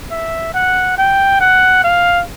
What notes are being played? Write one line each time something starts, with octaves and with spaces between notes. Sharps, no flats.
E5
F#5
G5
F#5
F5